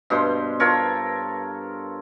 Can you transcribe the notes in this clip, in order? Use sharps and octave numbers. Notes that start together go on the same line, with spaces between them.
G2 B2 C5 C6
F4 A4 A#4 C#5